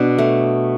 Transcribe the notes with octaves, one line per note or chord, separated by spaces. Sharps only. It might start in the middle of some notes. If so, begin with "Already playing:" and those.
Already playing: B2 D4
A3